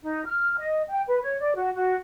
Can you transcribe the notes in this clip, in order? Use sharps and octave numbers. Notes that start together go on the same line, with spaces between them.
D#4
F6
D#5
G5
B4
C#5
D5
F#4
F#4